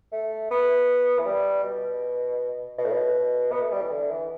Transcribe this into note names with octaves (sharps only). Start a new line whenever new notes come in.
A3
B3
E3
G3
B2
B2
A2
B2
B3
A3
G3
E3
D3
E3